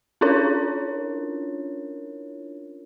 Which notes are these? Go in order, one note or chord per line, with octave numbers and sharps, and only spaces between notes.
C#4 D4 E4 F4 A#4 C#5